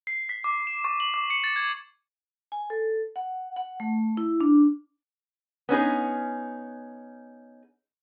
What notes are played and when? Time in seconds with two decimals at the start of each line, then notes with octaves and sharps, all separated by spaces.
0.07 C7
0.29 B6
0.44 D6
0.67 E7
0.84 C#6
1.00 F#7
1.14 D6
1.30 C#7
1.44 A6
1.56 G#6
2.52 G#5
2.70 A4
3.16 F#5
3.56 F#5
3.80 A3
4.17 E4
4.41 D4
5.69 B3 C#4 D#4 G#4